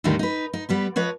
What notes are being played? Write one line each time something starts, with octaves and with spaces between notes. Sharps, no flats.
E2 A2 D3 D#3 G3 D#4
D#4 B4
D#4
G3 B3 B4
F3 B4 C#5 D#5